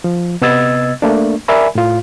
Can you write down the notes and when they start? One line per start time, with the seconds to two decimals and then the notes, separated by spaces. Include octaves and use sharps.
0.04 F3
0.42 C3 B3 D#5 E6 G#6 A6
1.02 A3 A#3 D4
1.48 A#4 D5 E5 G#5 B5
1.75 A2 F4